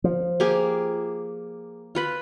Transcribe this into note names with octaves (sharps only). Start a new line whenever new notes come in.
F3
A#3 G4 G#4
F4 B4 B5